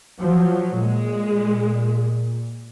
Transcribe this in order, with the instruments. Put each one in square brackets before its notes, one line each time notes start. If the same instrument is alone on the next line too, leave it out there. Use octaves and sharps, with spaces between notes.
[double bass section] F3 F#3
[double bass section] A#2 [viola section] G#3